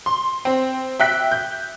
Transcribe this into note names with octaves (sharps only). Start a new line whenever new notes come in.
C6
C4
E5 G5 F#6 B6
G6